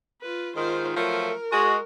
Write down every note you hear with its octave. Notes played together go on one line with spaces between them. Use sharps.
F4 B4
G#2 D#3 F4 C5
F3 F#3 A3 A#4
G#3 F#4